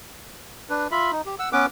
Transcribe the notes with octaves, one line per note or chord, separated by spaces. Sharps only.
D4 B4
F4 E5 B5
D#4
G4
F#5 E6
B3 C#4 B4 D6